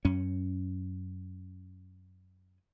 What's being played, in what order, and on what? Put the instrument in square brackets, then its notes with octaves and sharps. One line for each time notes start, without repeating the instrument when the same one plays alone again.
[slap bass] F#2 C#4